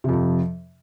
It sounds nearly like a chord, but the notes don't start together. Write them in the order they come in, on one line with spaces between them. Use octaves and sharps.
C3 F2 F3